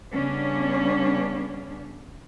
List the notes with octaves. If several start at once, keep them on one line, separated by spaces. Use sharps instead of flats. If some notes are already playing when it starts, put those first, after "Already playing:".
C#3 G3 B3 C#4 D4